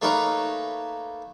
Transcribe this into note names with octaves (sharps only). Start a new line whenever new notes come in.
A3 A#3 D#4 A#4 B4 C#5